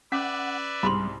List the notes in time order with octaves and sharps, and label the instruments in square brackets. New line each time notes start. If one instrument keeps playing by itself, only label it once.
[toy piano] C#4 [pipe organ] B4 D5 E5 [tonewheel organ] F#5 [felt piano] D6 B6
[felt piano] C2 G#2 C3 [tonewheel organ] G3 [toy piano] B5 C6